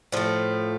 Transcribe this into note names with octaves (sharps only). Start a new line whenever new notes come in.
A2 F3 A3